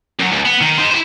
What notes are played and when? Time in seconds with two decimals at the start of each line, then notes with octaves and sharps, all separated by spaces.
0.20 F#2 F#3
0.32 C#2
0.45 B3
0.61 D#3
0.78 D#4 C5
0.91 E4 C5